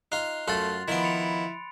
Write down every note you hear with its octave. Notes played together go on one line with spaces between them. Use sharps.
D#4 F4 F#6 C7 F7
F#2 A3 F4 F#5 C6 A6
D#3 F3 B3 E4 B5 C6 D7
A6 C#7 F7